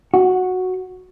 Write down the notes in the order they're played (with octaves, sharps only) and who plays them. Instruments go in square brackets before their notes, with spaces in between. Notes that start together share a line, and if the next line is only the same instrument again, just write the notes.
[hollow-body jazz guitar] F#4